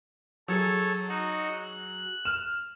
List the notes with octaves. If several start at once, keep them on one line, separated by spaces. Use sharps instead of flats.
F#3 G#4 A4 C#5
D#4 F#4
F#6
F6 E7